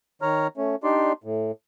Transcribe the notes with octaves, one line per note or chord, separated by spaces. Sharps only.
D#3 C#5 A#5 F6
A3 C#4
D4 D#4 G4 D5 C6
A2